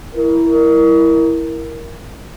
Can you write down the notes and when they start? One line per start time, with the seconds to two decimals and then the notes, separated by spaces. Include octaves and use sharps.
0.16 E4 A#4